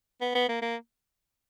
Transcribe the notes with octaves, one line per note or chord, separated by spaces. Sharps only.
B3
B3
A#3
A#3